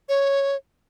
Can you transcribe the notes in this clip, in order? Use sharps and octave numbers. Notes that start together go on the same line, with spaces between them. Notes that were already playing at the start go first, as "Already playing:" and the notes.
C#5